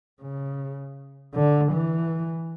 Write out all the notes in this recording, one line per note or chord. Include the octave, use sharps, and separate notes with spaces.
C#3
D3
E3